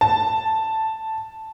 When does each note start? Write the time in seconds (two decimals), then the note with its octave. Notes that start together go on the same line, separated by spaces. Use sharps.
0.01 A5